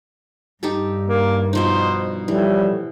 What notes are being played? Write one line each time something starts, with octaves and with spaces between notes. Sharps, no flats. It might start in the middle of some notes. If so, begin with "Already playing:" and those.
G2 D#4 G4 A4
A#3
B2 F3 D#4 C5
A2 E3 F3 G3